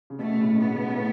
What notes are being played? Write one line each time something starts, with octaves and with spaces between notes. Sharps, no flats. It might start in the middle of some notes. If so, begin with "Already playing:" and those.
C#3
B2 A3
A2 C#3
B2
A2 B3
C#3
B2
A2